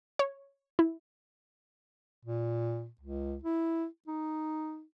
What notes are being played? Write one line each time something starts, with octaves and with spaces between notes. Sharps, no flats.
C#5
E4
A#2
C#2
E4
D#4